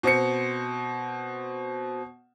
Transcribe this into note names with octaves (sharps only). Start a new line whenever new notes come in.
B2 C4 C#7